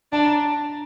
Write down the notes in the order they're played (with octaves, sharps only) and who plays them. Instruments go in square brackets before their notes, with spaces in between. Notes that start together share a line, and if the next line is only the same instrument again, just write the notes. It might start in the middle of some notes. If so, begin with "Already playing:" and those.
[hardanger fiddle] D4 [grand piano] A5
[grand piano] A#5